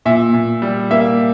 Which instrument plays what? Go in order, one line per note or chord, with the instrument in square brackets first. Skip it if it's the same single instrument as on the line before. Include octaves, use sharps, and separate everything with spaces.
[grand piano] A#2 E5
A#2
G3
A#3 E5